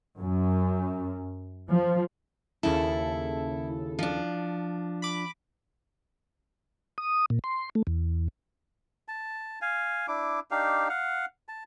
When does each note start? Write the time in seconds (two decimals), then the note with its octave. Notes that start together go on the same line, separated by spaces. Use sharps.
0.19 F#2
1.70 F3
2.63 D#2 C#3 E4 A4
3.99 F3 D4
5.02 B5 D6
6.98 D#6
7.30 A#2
7.44 C6
7.75 A3
7.87 E2
9.08 A5
9.62 F5 G#5
10.08 D4 E4 D6
10.51 D4 D#4 G4 F5
10.89 F5 F#5
11.48 A5